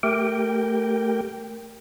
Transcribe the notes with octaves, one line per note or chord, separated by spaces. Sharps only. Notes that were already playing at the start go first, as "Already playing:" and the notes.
A3 G4 A#4 G5